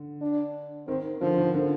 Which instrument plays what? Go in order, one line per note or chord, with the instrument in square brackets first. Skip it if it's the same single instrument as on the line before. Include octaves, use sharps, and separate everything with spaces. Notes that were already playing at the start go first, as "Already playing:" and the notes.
Already playing: [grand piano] D3
[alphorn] D4
[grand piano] D#3 [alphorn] C4
[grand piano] D3 [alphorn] F3
[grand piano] D#3
D3